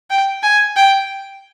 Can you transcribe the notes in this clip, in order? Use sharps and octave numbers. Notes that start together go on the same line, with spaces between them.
G5
G#5
G5